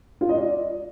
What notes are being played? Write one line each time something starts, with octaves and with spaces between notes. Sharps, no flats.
F4
D#5
D5